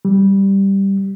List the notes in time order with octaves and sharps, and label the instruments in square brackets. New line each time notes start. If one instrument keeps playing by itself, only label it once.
[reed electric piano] G3